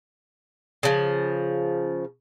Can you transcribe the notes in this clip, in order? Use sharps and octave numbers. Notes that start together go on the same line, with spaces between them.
C#3 F3